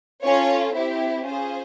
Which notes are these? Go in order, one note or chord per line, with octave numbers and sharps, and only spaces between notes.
C#4 F4 A4 C#5
C4 E4 G4
C#4 F4 G#4 C5